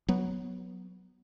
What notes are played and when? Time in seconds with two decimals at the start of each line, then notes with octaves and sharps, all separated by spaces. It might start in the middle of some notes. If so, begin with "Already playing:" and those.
0.08 F#3 B3